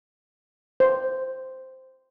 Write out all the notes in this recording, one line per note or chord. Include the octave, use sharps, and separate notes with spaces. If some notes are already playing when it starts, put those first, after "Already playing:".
C5